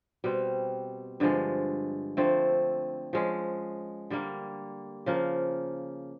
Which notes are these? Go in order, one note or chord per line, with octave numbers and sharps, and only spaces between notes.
B2 G3 C4
G2 D3 F3 G#3
D3 F3 A3 C4
F3 G#3 C#4
D3 G3 A#3
C#3 F3 A#3